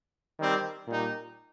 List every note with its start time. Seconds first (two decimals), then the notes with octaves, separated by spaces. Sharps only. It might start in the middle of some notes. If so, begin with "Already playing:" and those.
0.38 D#3 G3 C4
0.88 A#2 G3 D#4